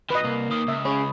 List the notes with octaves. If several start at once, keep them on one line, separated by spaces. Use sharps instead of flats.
B2 D#3 B4 D#5
C2 A#3
D#2 D#3 D#6
C#2 E5
C#4 G#4 C#5 B5